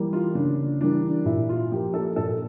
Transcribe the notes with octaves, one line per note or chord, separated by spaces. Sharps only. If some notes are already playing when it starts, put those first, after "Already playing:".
Already playing: E3 G3 A#3
F4
C#3 D4
E3 G3 A#3 D4
A#2 E4
F4
F3 A#3 G4
A4
A#2 A4